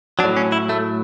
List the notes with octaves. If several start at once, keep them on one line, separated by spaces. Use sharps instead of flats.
F#3 D4
A2
C#4
E4
A3